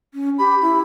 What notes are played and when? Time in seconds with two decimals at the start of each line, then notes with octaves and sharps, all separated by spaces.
0.14 C#4
0.39 G4 B5
0.62 E4